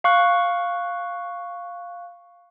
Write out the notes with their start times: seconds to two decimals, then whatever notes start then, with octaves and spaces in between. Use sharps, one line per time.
0.04 F5 C#6 F#6